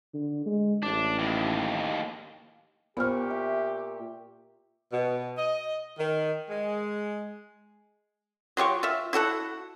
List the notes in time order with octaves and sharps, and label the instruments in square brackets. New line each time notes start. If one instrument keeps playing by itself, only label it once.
[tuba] D3
G#3
[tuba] A1 [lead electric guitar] D4
[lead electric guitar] D#2 A2
[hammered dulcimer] A#2 C#6 [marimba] B3 C5 F6 [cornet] G4
[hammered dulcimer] E5
[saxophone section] B2
D#5
D#3
G#3
[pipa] F#3 F4 G4 C#6
F4 E5
E4 F#4 A4 F#5